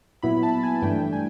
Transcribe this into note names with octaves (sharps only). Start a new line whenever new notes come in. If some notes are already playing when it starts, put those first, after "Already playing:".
A#2 F#3 B3 E4 B5
A5
G#5
G2 E3 A3 D4 G5
G#5